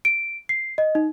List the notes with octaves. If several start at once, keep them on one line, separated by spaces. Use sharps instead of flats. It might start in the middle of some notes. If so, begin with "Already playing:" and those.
D7
C7
D#5
D#4